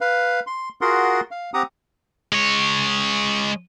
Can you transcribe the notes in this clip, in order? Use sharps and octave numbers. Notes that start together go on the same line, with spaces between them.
B4 F5
C6
F4 F#4 G#4 A#4 F#5 C6
F5
C4 G4 F#5 A#5 D#6
G#3 C#5